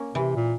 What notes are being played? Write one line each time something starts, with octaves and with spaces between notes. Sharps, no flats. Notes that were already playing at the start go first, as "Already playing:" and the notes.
Already playing: A#3 C#4
C3 E3
A#2